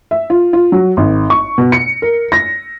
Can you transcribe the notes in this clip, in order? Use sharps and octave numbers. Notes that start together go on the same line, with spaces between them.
E5
F4
F4
F#3
G#1
C#6
B2
C#7
A#4
A#6